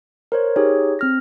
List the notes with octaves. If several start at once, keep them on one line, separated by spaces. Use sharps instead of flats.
A#4 C5 C#5
D#4 G4 G#4 C#5
C4 F6 A#6